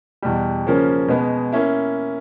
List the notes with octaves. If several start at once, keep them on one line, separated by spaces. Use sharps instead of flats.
E2 B2 G3
C#3 F3 A#3 C#4
B2 G#3 B3
A#3 C#4 E4